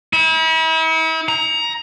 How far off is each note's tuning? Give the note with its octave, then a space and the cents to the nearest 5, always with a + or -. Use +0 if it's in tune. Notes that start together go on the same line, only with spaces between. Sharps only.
E4 -40
A#5 +20